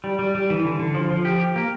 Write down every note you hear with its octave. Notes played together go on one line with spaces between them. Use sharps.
G3
G3
G3
E3
D3
D3
F3
F3
G4
G4
A#3